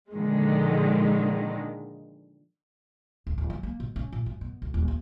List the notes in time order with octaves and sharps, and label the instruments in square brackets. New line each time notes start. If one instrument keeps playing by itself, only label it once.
[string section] A#2 D3 D#3 F3 G#3
[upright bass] D1
D1
F#3
A#3
B2
C#4
A#2
F#2
B2
D2
D#1
D#2